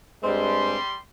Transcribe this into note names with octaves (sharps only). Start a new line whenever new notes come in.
G2 G3 G#3 C4 C6